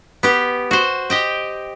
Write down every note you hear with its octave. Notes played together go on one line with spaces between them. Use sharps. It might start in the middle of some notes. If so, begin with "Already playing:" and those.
B3 G4
F#4 C5
G4 D#5 G5